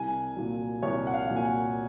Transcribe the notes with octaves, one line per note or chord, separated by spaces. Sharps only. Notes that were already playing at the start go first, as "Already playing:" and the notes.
Already playing: C2 G#5
A#2 F#3
C2 C#5
F#5
F5
A#2 F#3
G#5
F#5